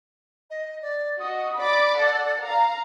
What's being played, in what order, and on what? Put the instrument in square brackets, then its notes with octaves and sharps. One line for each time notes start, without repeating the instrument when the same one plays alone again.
[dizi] D#5
D5
[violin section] F#4 D#5 [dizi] D#6
[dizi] D5 [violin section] B5 D6
[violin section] A4 F#5
F5 A#5